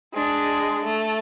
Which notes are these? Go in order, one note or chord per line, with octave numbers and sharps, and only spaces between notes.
G#3 D4
A3